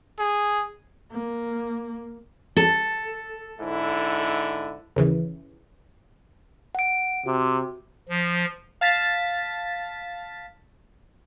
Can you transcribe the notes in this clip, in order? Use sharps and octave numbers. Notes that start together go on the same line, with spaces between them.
G#4
A#3
A4
G#2 D3 E4
D#2 C#3 E3
F#5 D7
C3 F#4
F3
F5 A5 A6 B6